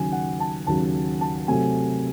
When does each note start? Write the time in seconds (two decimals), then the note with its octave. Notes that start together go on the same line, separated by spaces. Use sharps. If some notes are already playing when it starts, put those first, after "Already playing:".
Already playing: D#2 C#3 F#3 G#5
0.12 F#5
0.40 A5
0.67 D#2 C#3 F#3 A5
1.21 A5
1.48 C3 F#3 A3 C4 G#5